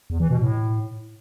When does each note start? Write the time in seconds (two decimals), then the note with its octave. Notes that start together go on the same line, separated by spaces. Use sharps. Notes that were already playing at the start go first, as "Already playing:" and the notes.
0.10 E2
0.20 E3
0.30 B2
0.40 A2